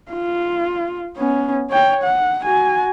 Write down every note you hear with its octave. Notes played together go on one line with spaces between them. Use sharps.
F4
B3 C#4
C#5 G5
F#5
F#4 G#5